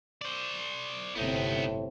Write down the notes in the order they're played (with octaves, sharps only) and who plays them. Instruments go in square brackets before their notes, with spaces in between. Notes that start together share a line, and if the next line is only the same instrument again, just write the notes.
[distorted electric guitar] C5 D5
[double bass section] G1 C3 C4 [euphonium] A2 [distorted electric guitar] B3 D#4